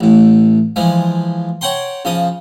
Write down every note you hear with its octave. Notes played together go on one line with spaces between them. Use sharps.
A1 A2
E3 F3 G#3
C#5 F#5 G5 A#5 C6
C#3 F3 D#5